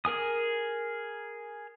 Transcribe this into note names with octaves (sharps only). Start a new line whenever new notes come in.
G#4 A#4 G#5 D#6